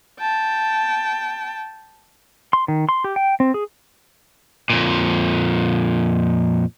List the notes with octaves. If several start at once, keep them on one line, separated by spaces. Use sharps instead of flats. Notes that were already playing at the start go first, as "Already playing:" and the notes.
G5 A5
C6
D#3
C6
G4
G5
C4
G#4
F2 A#2